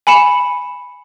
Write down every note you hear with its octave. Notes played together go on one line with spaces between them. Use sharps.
G#5 B5 C#7 E7